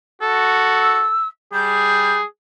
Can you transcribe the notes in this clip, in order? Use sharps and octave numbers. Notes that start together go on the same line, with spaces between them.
F#4 A4
E6
G3 G#4 G6